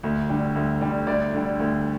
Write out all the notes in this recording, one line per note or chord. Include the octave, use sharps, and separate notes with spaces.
D2
D3 G3
D2
D3 G3
D2 D5
D3 G3
D2